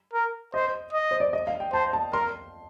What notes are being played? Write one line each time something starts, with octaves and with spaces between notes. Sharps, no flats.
A#4
C5 D#5
D#5
C5
D5
D#5
F5
G5
C5 A5
A5
A#4 C6